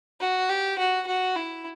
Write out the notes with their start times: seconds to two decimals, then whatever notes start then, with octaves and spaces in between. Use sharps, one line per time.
0.21 F#4
0.49 G4
0.78 F#4
1.07 F#4
1.36 E4